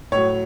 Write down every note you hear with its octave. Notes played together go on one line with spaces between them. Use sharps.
A2 F#3 C#5